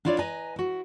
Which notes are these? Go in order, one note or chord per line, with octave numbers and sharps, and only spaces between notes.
D4 E4 F4 C#5 D5
B4 D#5 G#5 A#5
E4 F#4